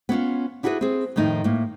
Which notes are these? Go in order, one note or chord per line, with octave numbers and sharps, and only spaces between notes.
B3 C#4 D#4 F4
D4 E4 F#4 G#4 A4 B4
C4 G#4
F2 A2 D#3 D#4
A2 A#3